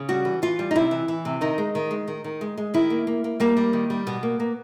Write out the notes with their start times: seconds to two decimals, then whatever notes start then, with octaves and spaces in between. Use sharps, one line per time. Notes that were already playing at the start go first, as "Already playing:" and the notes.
Already playing: C#3
0.09 G3 F#4
0.25 E3
0.42 E3 F4
0.59 G3
0.71 D#4
0.75 C3 E4
0.91 E3
1.08 E3
1.25 C3
1.41 D#3 D#4
1.58 G#3
1.75 D#3
1.91 G#3
2.08 D#3
2.24 D#3
2.41 G#3
2.57 G#3
2.74 D#3 E4
2.90 A#3
3.07 A#3
3.24 A#3
3.40 G3 A#3
3.57 G3
3.73 D#3
3.90 G3
4.07 B2 B3
4.23 A#3
4.40 A#3